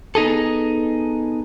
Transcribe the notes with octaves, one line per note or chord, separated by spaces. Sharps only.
B3 D#4 G#4 A4